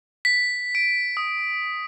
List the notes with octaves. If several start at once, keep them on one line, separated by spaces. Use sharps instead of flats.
B6
D7
D#6